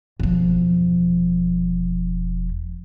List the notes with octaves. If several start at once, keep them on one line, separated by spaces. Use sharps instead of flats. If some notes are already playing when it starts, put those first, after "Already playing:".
E1 F3